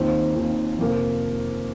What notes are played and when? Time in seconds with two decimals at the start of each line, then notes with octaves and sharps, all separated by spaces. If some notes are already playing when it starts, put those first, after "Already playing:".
Already playing: D#2 D#3 C4 F4 C5
0.36 D#2 D#3 C4 F4
0.79 F2 C3 F3 A#3